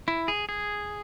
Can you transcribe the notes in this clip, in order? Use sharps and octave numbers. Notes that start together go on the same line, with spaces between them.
E4
G#4
G#4